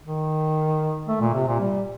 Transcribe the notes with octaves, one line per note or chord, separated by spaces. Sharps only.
D#3
A3
A#2
C3
A#2
G3